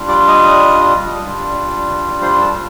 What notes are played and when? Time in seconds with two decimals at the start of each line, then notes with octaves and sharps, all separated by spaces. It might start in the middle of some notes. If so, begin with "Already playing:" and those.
Already playing: G3 D4 F4
0.08 D5 D6
0.28 D#5 D#6
1.25 G3 D4 F4
2.22 C5 C6
2.41 A4 A5